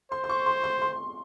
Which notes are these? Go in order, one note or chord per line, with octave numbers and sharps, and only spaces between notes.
C5 C6
C6
C#6
C6
C6
C6